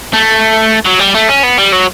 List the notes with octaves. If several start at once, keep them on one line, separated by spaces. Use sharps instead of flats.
A3
F#3
G3
A3
C#4
B3
G3
F#3